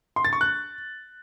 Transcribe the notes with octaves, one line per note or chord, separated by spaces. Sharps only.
C6
A6
C#6
F#6